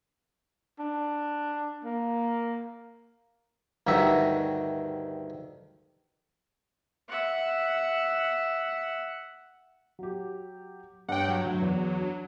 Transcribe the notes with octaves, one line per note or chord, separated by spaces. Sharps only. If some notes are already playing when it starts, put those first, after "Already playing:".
D4
A#3
D2 G2 D#3 F#4 E5
E5 F#5
F#3 G4
G2 C#5 F#5 G5
F#3
D2 D3
E2
D4